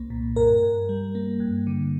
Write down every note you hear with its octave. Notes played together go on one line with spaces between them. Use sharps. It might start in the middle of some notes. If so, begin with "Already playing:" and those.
Already playing: C2 A#3
A#2
G2 A#4
G2
G3
A#3
G2
D3